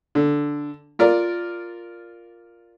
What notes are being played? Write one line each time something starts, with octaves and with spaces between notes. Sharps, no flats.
D3
F4 A#4 D5